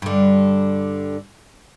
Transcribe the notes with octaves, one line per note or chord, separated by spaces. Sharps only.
G2 D3